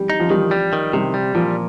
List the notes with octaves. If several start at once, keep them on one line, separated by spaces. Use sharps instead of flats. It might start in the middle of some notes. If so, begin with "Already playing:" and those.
Already playing: G3
D#4
F3
D#3 G3
G3
D#3
C3 G3
G3
A#2 F3